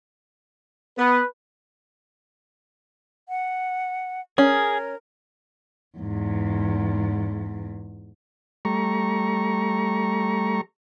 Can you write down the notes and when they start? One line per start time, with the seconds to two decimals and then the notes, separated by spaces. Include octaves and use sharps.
0.98 B3 B4
3.29 F#5
4.38 C#4 G#4 A#4
5.98 E2 G#2
8.65 G3 A3 A#5 C#6